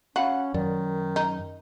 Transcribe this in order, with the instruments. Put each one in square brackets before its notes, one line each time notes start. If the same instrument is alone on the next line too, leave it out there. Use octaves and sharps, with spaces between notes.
[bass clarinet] C#4 [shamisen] F#4 [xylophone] F5 F#5 B5
[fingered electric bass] F#2 [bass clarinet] D#3 [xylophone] D5
[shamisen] D#4